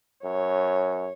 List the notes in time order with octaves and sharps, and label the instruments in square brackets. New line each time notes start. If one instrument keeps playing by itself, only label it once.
[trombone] F#2 [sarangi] C#5